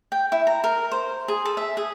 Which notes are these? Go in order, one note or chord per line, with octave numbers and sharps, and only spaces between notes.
G5
E4
A#5
A#4
C5
G#4
A4
E5
G#4